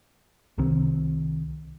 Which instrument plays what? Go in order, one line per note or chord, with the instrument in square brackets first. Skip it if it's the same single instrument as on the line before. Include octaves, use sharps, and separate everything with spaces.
[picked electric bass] C2 C3 D#3 C4